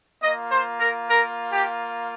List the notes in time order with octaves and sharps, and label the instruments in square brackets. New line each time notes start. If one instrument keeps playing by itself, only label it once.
[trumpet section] A#3 F4 D#5
C5
A#4
A#4
G4